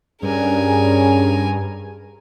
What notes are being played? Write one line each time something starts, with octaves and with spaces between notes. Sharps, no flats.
G2 G3 C#4 G#4 A#4 G#5